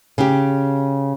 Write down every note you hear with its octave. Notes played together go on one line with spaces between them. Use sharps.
C#3 G4